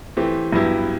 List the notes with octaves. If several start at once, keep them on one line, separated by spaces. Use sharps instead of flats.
E3 A3 C4 G4
G2 F#3 B3 E4 G4